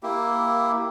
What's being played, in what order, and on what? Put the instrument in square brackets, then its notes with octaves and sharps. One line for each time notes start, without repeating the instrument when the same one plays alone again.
[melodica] A#3 E4 G4